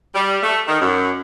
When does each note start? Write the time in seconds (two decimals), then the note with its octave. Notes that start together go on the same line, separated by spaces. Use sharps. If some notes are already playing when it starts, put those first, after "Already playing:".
0.15 G3
0.43 A3
0.68 D#3
0.81 F#2